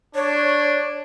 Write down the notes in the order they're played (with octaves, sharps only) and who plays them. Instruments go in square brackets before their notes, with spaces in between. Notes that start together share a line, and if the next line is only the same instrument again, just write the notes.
[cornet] D4 [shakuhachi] C#5